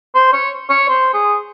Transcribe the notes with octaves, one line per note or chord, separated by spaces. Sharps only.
C5
C#5
C#5
C5
G#4